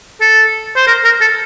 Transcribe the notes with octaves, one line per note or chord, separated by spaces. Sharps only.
A4
C5
A#4
A#4
A4